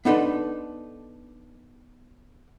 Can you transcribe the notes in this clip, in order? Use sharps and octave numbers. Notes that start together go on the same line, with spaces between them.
B3 D4 D#4 A4 B4